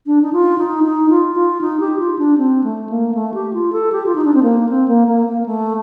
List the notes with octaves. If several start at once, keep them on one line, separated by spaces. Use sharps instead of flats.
D4
D#4
F4
D#4
D#4
F4
F4
D#4
G4
F4
D4
C4
A3
A#3
A3
G4
F4
A4
G4
F4
D#4
D4
C4
A#3
C4
A#3
A#3
A#3
A3